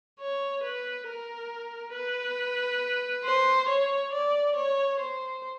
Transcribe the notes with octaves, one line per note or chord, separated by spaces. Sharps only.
C#5
B4
A#4
B4
C5
C#5
D5
C#5
C5